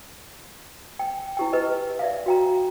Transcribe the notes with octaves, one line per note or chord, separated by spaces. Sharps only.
G5
E4 G4 G5
G4 B4 D#5
D5 E5 F5
F#4 G5 A#5